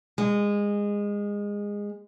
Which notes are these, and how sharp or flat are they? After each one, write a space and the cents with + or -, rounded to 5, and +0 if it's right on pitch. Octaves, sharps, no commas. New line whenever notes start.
G#3 -20